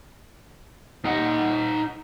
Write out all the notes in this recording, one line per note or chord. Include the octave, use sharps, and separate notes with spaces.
D#4 F#5